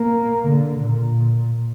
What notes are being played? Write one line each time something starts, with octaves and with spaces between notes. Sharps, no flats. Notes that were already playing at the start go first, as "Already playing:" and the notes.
Already playing: A#3
D3
A#2